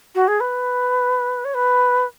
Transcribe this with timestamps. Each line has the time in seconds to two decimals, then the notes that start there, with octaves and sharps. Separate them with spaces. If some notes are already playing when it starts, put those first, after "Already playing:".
0.15 F#4
0.27 G#4
0.40 B4
1.45 C#5
1.54 B4